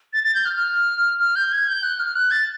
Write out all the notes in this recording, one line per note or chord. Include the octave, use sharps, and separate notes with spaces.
A6
A6
G6
F6
F6
F6
G6
G#6
G6
F#6
F6
F#6
A6